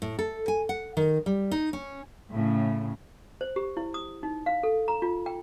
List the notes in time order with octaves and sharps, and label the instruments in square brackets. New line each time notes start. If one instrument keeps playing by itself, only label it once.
[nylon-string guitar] A2
A4
G#5
F#5
D#3
G3
D#4
C#4
[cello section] A2 C#3
[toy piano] C5
G4
E4
D#6
D#4
F5
A4
A#5
F4
G5